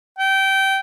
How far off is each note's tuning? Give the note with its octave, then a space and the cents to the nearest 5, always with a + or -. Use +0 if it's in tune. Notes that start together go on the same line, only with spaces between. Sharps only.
G5 -20